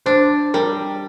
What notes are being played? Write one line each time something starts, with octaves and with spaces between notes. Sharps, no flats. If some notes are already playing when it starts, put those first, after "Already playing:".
D4 C5
G3 A#4